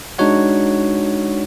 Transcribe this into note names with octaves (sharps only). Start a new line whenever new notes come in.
G#3 D4 D#4 F#4 C#5 F#5